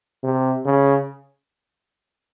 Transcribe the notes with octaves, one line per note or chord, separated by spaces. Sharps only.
C3
C#3